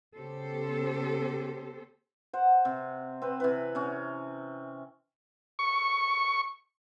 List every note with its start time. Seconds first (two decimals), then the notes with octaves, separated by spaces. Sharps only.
0.17 C#3 B3 G4 A4 C5
2.33 C5 F#5
2.65 C3
3.22 C4 B4
3.40 C3 E3 B4
3.75 C3 C#4
5.59 C#6